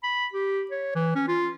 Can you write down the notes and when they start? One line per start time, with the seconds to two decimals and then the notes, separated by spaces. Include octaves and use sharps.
0.03 B5
0.33 G4
0.71 C#5
0.95 E3
1.15 C#4
1.28 F4